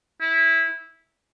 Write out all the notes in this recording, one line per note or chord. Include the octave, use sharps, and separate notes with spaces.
E4